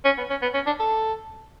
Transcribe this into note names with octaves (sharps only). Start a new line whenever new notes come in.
C#4
B3
C#4
B3
C#4
D4
A4